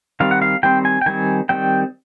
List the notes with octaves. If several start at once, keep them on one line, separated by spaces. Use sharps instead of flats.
D#3 G3 C4 F5
F#5
F5
D#3 G3 C4 G5
G#5
G5
D#3 G3 C4 G#5
D#3 G3 C4 G5